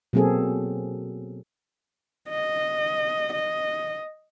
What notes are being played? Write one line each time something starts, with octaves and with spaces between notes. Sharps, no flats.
B2 F#3 A#3 C4 G#4 A4
D#5
D#5